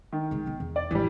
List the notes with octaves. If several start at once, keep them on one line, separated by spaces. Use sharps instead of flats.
D#3
C#3 G#3
D3 B3
E2
D5
A1 E3 F3 G3